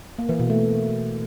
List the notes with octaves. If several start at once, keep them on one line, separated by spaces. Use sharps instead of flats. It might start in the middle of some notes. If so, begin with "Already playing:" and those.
A#3
E3
B2
A3